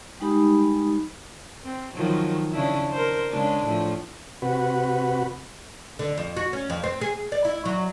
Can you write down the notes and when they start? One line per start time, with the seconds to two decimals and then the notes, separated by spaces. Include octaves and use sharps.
0.20 G3 G#3 D#4 G4 B5 D#6
1.64 C4
1.94 D#3 F3 F#3
2.52 C#3 D4 E4
2.92 A#4 C5
3.30 C#3 G#3 D4
3.65 A2 F3
4.42 C3 F#4 B4
5.99 D3
6.18 F2
6.37 F#4
6.53 C#4
6.70 F2
6.84 C4
7.01 G#4
7.32 D5
7.45 E4
7.65 F#3